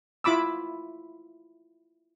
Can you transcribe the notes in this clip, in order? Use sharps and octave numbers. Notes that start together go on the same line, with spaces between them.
E4 F4 B5 D6 E6